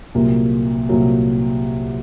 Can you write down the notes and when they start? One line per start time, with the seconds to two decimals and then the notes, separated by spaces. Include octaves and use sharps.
0.15 C2 A#2 F#3 A#3
0.88 C2 A#2 F#3 A#3